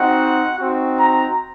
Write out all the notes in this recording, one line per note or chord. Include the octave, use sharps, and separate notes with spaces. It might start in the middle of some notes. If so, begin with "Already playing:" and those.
Already playing: C4 D#4 F#4 F#5
C4 D#4 F#4
A#5